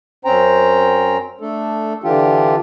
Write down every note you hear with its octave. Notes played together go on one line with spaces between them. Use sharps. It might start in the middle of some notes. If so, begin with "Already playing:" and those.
F#2 C4 C#4 C5 G5 A#5
A3 D4 A4
D3 E3 D4 F4 G4